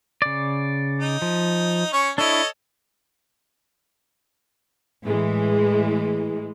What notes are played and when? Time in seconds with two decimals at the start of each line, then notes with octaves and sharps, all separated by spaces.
0.22 C#3 D5
0.98 D#4
1.22 F3
1.93 C#4 C#6
2.18 D4 E4 A4 C#5 D#5
5.05 A2 E3 G#3